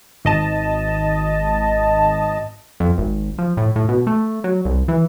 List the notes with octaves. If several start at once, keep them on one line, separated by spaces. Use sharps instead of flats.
G#1 D#5 A5
F2
G#1
F3
A2
A2
B2
A3
F#3
C2
E3